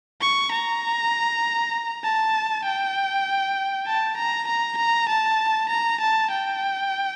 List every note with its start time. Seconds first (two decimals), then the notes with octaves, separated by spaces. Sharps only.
0.21 C#6
0.52 A#5
2.04 A5
2.65 G5
3.87 A5
4.17 A#5
4.47 A#5
4.78 A#5
5.09 A5
5.69 A#5
6.00 A5
6.31 G5